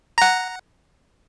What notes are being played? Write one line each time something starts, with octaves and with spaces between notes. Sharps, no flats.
F#5 A#5